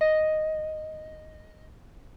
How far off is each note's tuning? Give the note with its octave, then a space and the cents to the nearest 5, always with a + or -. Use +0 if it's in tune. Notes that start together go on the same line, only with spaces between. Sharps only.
D#5 +0